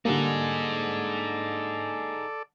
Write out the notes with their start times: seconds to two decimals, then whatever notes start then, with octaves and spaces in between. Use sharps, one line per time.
0.05 D3 G3 A#3 D#4 G#4 A4 D5